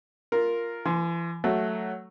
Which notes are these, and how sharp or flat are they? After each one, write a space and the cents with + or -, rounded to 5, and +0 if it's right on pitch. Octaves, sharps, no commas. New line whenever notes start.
F4 +0 A#4 +0
E3 +40 C6 +0
F#3 +5 A3 +0